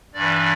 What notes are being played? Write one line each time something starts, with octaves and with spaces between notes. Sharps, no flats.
G2 E3 D5